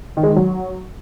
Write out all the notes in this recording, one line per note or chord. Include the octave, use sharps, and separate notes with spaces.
D#3
G#3
D#3
F#3